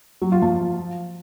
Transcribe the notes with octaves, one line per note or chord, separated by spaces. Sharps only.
F#3
F4
F3